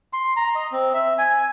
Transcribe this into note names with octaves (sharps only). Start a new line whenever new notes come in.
C6
A#5
D#5
C4
E5
G#5